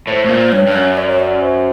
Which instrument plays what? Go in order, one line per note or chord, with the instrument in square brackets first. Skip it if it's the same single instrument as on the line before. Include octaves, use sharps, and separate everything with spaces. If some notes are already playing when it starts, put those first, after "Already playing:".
[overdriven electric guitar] A2 [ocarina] C5 C#5
[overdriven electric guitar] A2
A#2
[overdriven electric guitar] G2 [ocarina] C#5
[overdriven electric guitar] G2
F#2
[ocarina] D5
C#5
D5
C5